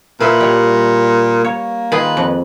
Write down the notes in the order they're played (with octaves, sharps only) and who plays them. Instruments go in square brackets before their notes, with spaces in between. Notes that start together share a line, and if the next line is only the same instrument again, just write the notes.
[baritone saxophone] A#2 [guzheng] E4 E5 C6 [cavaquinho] B4 B5
[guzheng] G3 C#5
[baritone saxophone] A#3 [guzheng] C#5
[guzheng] D#3 F4 G#4 [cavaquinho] B4
[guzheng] F2